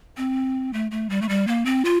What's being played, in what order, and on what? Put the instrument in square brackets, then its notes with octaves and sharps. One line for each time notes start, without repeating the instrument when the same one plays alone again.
[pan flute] C4
A3
A3
G3
A3
G3
A#3
C4
F4